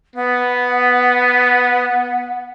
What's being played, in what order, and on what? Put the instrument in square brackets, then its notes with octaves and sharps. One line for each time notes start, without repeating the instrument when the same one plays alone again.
[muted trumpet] B3 [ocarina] F#5